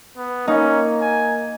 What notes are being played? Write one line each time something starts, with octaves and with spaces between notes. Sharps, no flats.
B3
A#3 C#4 D#4
G#5